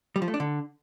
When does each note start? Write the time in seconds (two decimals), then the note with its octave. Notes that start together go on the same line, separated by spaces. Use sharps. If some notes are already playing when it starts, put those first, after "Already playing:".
0.16 G3
0.22 F3
0.28 A3
0.34 D4
0.40 D3